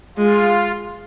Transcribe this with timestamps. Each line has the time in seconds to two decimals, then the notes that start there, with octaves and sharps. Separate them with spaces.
0.17 G#3 F4